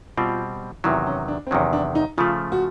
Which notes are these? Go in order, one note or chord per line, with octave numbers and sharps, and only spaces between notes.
B2 G3 C4 F4
E2 C3 D#3 F#3 E4
C#4
D4
C4
E2 C3 D#3 F#3 C#4
D4
D#4
C#3 F3 A3 F4
F#4